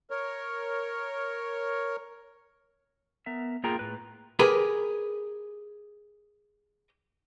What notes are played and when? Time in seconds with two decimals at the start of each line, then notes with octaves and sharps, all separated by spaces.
0.10 A#4 C#5
3.26 B3 A#4 E5
3.64 A#3 F4 G#4 A#4 G5 A#5
3.79 A2 B4
4.39 G4 G#4 A#4 B4